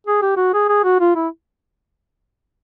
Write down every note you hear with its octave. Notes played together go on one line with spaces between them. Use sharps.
G#4
G4
F#4
G#4
G#4
F#4
F4
E4